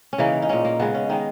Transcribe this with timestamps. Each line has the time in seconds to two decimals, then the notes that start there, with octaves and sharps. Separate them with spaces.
0.13 C#4
0.18 C#3 E3 A#3 D#4
0.42 D#4
0.49 A#2 A#3 C#4
0.65 A#3
0.79 C#3 G#3 B3
0.95 C#4
1.09 D#3 G#3 D#4